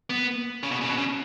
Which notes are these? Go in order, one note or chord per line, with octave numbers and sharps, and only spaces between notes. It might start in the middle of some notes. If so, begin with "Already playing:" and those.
B3
C#3
B2
C#3
B2
C#3